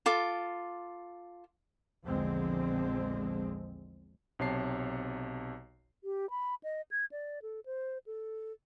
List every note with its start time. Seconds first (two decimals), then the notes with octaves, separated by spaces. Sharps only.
0.06 F4 A4 D6
2.06 A#1 E2 D3 F3 G#3 C4
4.39 B1 C3 C#5 A5 C7
6.04 G4
6.30 B5
6.64 D#5
6.91 G#6
7.12 D5
7.42 A4
7.66 C5
8.06 A4